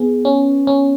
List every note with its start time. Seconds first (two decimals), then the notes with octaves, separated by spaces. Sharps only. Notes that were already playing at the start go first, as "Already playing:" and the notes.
Already playing: B3 G#4
0.25 C#4
0.67 C#4